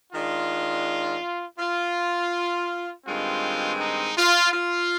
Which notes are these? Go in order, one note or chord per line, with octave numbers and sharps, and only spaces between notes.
D#3 G#3 D4 F4
F4
G2 D#3 G#3 C4 F4
D#4
F4
F4